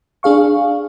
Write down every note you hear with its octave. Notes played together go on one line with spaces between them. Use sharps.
D4 G#4 F5 C#6